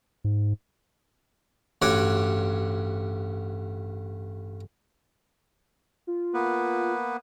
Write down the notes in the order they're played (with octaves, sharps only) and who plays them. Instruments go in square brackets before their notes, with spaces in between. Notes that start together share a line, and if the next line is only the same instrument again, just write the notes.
[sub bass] G#2
[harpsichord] A1 G2 F#4 C#5 F#5 D6
[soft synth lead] F4
[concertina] A#3 B3 B4